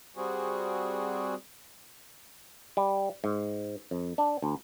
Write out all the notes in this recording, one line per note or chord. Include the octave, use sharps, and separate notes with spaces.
G3 C4 F#4 G#4
G3
G#2
F2
D4
D2